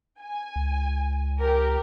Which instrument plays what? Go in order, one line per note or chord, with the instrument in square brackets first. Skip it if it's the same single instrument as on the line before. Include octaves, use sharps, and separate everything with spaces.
[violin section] G#5
[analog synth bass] C#2
[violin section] G4 A#4